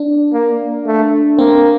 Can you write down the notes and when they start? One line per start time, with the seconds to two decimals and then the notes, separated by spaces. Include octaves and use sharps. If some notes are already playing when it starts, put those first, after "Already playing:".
Already playing: D4
0.33 A#3
0.86 A3
1.38 A#3 C4